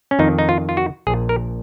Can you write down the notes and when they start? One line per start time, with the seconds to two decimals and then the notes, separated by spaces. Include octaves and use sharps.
0.11 C#4
0.19 F2 D#3 D#4
0.39 D#4
0.49 F4
0.69 F4
0.77 F#4
1.07 A#1 G#4
1.10 A#2
1.29 A#4